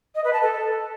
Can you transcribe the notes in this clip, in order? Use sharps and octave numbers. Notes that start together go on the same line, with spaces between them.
D#5
B4
A5
A4